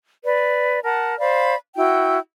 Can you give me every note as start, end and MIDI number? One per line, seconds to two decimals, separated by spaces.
0.24 0.80 71
0.24 0.80 74
0.83 1.17 70
0.83 1.17 78
0.83 1.17 81
1.19 1.55 72
1.19 1.55 74
1.19 1.55 77
1.19 1.55 83
1.77 2.18 64
1.77 2.18 66
1.77 2.18 79